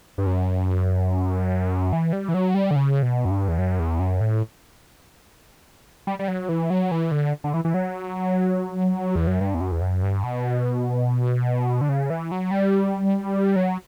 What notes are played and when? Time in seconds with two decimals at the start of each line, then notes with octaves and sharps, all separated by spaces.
0.18 G2
0.26 F#2
1.93 E3
2.13 G3
2.29 E3
2.34 F#3
2.54 G3
2.71 D3
2.76 C#3
3.02 B2
3.25 F#2
3.31 G2
3.48 E2
3.58 F#2
3.79 E2
3.99 F#2
4.21 A2
6.07 G3
6.19 G3
6.28 F#3
6.49 E3
6.70 F#3
6.91 E3
7.11 D3
7.44 D3
7.54 E3
7.65 E3
7.74 F#3
9.16 E2
9.27 F#2
9.41 G2
9.54 E2
9.61 F#2
9.72 E2
9.81 F#2
10.03 G2
10.24 B2
11.81 D3
11.89 C#3
12.10 E3
12.31 F#3
12.51 G3
13.56 F#3